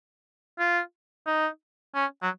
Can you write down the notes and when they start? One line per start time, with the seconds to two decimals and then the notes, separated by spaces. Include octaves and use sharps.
0.59 F4
1.27 D#4
1.95 C#4
2.23 F#3